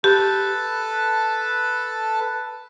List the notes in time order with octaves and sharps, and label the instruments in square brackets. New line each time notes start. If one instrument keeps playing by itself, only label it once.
[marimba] G4 [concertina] A4 B4 A5